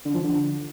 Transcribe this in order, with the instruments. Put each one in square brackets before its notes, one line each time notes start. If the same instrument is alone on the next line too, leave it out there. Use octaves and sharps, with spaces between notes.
[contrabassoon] D3
F3
D3